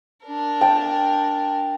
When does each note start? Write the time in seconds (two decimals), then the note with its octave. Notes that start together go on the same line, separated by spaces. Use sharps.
0.25 D4 A#4
0.61 G5 A5